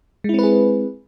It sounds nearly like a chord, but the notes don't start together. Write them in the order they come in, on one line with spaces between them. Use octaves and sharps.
G#3 E4 C4 B4 G#4